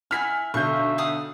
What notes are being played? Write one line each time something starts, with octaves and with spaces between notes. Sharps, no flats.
E4 F#5 G#5 F6 B6
B1 D3 E5 C#6 G6
F5 F#5 D#6